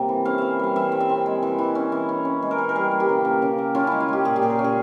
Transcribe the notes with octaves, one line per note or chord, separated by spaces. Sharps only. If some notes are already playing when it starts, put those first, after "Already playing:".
Already playing: C3 G3 A#3
E3
C#4 F5
E3 E5
G3 F5
E3 E5
C4
E5
C4
G#3
E3
E3
C#4
E3
C#4
C#4
G#3
A#4
E3
A#4
G3 G#4
A#3
G4
C#3
A#3
C#3
A#3
C#4 F4
G#3 E4
F4
G#3 G4
A#2 G#4
G4
A#2 G#4
A#4
C#4
G#4